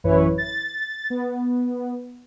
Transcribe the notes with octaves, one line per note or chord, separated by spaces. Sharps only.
A1 F#2 E3 E4 B4 C#5
A6
B3